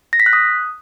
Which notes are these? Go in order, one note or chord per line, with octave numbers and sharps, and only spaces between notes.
A#6
B6
F#6
D#6